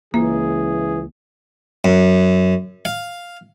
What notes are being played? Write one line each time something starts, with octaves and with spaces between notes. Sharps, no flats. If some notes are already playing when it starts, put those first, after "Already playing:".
C#2 E3 A#3 G#4
F#2
F5